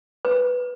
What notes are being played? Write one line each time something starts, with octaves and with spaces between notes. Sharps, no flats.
B4